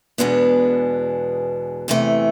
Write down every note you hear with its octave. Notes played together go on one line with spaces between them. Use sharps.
E2 B2 G#3 B3 D4
E2 C3 E3 A3